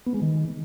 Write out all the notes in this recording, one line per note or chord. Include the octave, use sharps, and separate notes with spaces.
B3
G#3
D#3